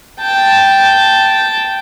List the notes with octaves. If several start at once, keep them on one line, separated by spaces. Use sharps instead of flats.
G5 A5